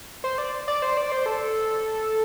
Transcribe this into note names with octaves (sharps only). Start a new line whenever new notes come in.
C5
D5
D5
C5
D5
C5
A4